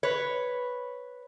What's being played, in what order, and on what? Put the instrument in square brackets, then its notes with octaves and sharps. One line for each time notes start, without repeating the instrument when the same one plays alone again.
[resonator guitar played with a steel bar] B4 C#5